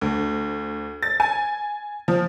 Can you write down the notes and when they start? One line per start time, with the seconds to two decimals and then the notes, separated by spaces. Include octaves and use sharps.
0.01 D2
1.03 A6
1.20 G#5
2.08 F3